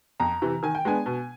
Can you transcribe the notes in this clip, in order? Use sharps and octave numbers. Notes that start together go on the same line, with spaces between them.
F2 A#5
C3 E3
D#3 G#5
G5
G#3 B3 D4 G#5
B2